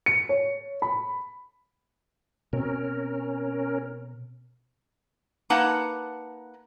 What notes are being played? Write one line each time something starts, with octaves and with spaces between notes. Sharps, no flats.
C#7
C#5
B5
B2 C4 C#4 A#4
A#3 D#4 B4 F#5 A5 A#5